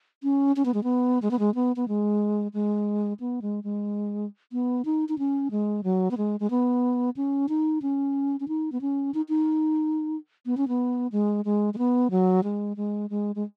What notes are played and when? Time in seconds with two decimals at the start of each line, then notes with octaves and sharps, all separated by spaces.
0.23 C#4
0.56 C#4
0.65 B3
0.74 G#3
0.83 B3
1.22 G#3
1.31 B3
1.39 G#3
1.55 B3
1.76 B3
1.88 G#3
2.54 G#3
3.20 B3
3.42 G#3
3.64 G#3
4.52 B3
4.85 D#4
5.09 D#4
5.19 C#4
5.51 G#3
5.84 F#3
6.11 B3
6.17 G#3
6.40 G#3
6.50 B3
7.17 C#4
7.49 D#4
7.82 C#4
8.40 C#4
8.48 D#4
8.72 B3
8.81 C#4
9.14 D#4
9.29 D#4
10.46 B3
10.57 C#4
10.68 B3
11.12 G#3
11.45 G#3
11.74 G#3
11.78 B3
12.11 F#3
12.44 G#3
12.77 G#3
13.10 G#3
13.35 G#3